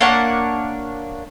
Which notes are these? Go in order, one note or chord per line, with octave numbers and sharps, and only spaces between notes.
A#3 D4 C#5 F#5